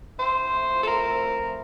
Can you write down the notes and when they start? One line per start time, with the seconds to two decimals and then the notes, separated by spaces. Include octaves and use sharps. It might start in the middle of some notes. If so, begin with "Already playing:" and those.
0.18 E4 C5
0.36 C4
0.53 A3
0.70 F3
0.83 A4
0.87 E4 A#4
1.05 C4
1.21 A3
1.38 F3